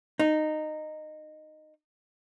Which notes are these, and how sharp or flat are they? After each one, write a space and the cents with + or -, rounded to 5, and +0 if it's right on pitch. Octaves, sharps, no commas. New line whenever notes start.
D#4 -15